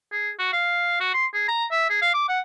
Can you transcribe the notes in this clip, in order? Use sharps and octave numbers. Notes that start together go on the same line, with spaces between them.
G#4
F#4
F5
F#4
C6
G#4
A#5
E5
G#4
F5
D6
F#5